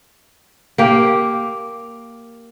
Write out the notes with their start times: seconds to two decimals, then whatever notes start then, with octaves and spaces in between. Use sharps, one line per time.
0.78 A#3 G4